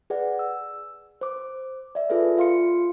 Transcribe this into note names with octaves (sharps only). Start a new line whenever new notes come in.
G#4 B4 D5 F#5
E6
C5 D6
D5 E5
F4 G#4 A4 B4 E5
F4 F5 C6 C#7